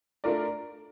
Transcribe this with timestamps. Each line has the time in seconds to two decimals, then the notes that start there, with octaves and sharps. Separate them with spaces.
0.24 A3 D4 F4 A#4 D5